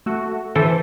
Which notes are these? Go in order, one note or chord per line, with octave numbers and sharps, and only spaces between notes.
A3 F#4
E3 A4 C5 E5